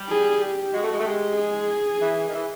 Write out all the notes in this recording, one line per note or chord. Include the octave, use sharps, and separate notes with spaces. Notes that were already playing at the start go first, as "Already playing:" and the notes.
Already playing: G3
G#4
G4
G#3 F#4
A3
G#3
A3
G#3 G4
G#4
E3
D#3
E3